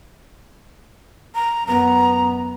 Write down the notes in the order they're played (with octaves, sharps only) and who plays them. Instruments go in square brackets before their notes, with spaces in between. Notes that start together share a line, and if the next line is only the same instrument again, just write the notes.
[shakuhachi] A#5
[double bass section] F#2 B3 [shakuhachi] A#5